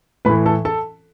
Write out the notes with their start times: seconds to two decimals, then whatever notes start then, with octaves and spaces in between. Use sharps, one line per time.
0.25 A2 B4 B5
0.29 E3
0.46 A4 A5
0.65 A4 A5